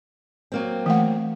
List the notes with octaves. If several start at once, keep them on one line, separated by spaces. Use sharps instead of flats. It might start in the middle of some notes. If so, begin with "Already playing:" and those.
F#3 A#3 C4
E3 A3 F#5